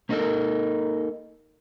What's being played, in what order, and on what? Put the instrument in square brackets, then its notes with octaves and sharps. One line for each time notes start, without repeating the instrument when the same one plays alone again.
[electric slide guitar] A#3 C#4 D#4 E4 A4 A#4